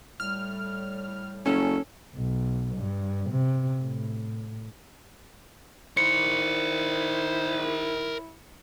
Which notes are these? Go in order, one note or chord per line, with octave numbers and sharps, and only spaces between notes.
A2 G3 F6
F#1 C#4 A4
B1
G2
C3
A2
D#3 E4 A#4 C5 C#7